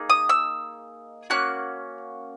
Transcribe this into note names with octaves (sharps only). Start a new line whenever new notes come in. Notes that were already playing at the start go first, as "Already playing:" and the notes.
Already playing: A#3 D#4 G#4
D#6
E6
A#3 C#4 F#4 F#6